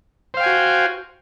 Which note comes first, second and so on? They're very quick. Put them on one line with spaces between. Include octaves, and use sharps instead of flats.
C5 F5 G5 G#5 F#4